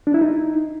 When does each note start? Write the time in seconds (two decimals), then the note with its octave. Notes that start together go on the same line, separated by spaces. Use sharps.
0.07 D4
0.14 E4
0.21 D#4